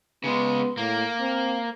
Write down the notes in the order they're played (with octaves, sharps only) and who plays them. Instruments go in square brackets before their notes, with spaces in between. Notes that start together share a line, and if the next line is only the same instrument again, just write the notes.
[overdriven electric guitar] C#3 G#3 [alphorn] B3
[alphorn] A2 [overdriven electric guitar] A#3
[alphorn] C4